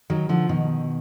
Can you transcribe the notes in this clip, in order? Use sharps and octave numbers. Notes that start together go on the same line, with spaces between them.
D#3 F#3
D3 F3
B2 D#3